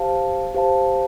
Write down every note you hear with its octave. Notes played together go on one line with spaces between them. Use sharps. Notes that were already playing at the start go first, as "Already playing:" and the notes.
Already playing: G4 C5 F5 A5
G4 C5 F5 A5